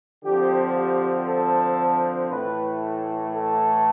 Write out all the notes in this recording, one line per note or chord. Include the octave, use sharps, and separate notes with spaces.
D3 F3 C4 G4
G4
A4
A2 E3 A3 B4
A4